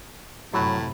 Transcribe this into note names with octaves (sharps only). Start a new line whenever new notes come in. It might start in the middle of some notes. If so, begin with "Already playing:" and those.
F#2 A2 C3 F#3 B5